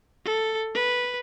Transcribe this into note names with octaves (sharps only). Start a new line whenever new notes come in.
A4
B4